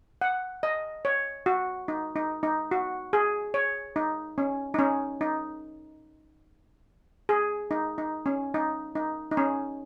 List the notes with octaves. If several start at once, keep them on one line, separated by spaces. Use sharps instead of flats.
F#5
D#5
C#5
F#4
D#4
D#4
D#4
F#4
G#4
C#5
D#4
C#4
D#4
C#4
D#4
G#4
D#4
D#4
C#4
D#4
D#4
D#4
C#4